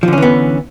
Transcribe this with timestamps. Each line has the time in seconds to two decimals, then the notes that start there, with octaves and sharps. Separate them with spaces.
0.03 F3
0.08 D3
0.13 C#4
0.18 E3
0.22 B3